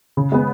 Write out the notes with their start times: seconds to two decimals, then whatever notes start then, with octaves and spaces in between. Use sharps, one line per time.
0.17 C#3
0.32 G#3 B3